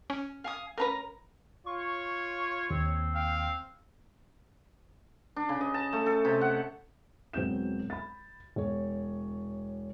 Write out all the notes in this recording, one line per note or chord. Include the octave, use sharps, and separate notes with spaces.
C#4
F5 G#5 D#6
A3 C#4 A#4 B4 A#5
F4 C#5 C#6
D#2 C4
F5 G5
D4
C#3
D#5
A5
A3
A4
C3
F#5
E1 F#3 B3 C4 G6 E7
B5 A6
E1 C#5